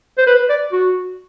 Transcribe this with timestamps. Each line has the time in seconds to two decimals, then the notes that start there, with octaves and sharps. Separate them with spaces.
0.18 C5
0.27 B4
0.50 D5
0.73 F#4